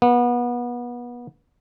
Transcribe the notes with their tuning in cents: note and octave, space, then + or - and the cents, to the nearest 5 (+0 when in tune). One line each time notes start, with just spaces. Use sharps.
B3 -30